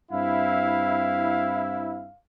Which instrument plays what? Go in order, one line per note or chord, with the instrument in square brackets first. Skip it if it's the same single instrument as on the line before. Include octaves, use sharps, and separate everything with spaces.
[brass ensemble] G2 C4 E4 [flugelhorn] F5